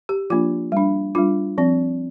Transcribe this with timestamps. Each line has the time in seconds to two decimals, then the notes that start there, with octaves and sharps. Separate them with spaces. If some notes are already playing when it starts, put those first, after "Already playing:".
0.09 G4
0.30 F3 A#3 D4 F4
0.72 G3 D4
1.15 G3 D4 F4
1.58 F3 C4